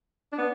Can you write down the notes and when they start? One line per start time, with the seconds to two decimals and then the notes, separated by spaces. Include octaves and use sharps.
0.33 D4
0.38 B3